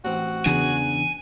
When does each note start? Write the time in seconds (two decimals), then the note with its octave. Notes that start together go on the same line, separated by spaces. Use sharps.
0.05 A1 C4 F#4
0.46 E2 C#3 E3 D4 G#4 G#5